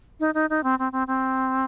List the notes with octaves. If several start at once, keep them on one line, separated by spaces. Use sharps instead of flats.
D#4
D#4
D#4
C4
C4
C4
C4